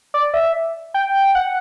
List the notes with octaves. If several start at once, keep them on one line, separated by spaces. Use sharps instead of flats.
D5
E5
G5
F#5